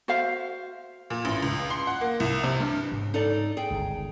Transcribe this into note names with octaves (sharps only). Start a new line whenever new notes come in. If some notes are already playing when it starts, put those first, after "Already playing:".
F#4 C5 E5 F5
A#2
A1
C#2
C6
F#5
A#3
C2
C3
G2
G#2 C#3
D#4 A4 D5
G#4 G5
G1 C#2